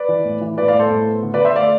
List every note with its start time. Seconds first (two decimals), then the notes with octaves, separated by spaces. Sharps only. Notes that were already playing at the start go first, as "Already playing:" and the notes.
Already playing: B4 D5
0.09 E3
0.25 A2
0.41 E3
0.58 A2 B4 D5
0.68 D5 F5
0.74 A2
0.79 A4 C5
0.90 A2
1.07 B3
1.23 D3
1.34 B4 D5
1.39 D3
1.45 C5 E5
1.56 A3 D5 F5